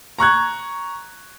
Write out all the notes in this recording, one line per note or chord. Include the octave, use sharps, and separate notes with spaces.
A#5 C#6 F#6 G#6